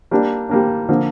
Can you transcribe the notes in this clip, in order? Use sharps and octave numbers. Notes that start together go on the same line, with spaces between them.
G3 A#3 D4
G3 A#3 D4
D3 F3 A#3